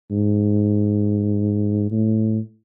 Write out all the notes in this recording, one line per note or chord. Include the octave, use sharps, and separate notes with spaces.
G#2
A2